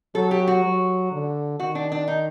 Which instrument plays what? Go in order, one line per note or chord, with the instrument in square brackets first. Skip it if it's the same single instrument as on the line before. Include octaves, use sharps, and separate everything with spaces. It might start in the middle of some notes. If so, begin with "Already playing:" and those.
[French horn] F#3 [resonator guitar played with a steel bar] A4
[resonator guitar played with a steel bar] G4
F#4
[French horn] F#3
D3
[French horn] D#3 [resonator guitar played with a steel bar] F#4
[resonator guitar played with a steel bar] D4
D4
D#4